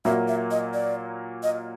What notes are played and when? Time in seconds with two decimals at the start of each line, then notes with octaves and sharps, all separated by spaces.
0.05 A#2 F#3 A#3 E5
0.28 E5
0.51 D#5
0.74 D5
1.43 D#5